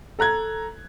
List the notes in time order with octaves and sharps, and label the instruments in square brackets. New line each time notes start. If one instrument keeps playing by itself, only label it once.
[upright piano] A4 A#5 F#6 G#6